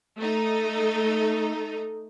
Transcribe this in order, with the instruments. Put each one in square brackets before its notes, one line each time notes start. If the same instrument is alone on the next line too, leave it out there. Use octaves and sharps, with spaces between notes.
[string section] A3 D#4